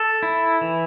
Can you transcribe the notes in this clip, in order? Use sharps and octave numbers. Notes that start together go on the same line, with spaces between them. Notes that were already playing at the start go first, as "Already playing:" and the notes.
Already playing: A4
E4
E3